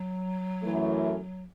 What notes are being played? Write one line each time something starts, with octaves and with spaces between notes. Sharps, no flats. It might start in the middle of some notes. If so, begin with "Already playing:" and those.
Already playing: F#3
F#2 E3 A3